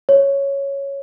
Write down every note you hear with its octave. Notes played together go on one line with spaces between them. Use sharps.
C#5